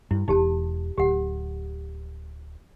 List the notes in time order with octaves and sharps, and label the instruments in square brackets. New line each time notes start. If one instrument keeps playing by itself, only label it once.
[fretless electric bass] G2 [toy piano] E4
[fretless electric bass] E1 [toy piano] D#4 G4 A5
[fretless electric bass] D1 [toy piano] G4 F#5